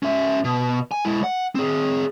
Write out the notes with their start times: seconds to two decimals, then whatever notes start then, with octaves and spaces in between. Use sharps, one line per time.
0.03 C#4 E5
0.44 B2
0.92 G#5
1.05 G#3 E4
1.24 F#5
1.55 C4 G#4